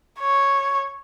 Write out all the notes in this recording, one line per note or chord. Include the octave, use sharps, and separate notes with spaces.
C#5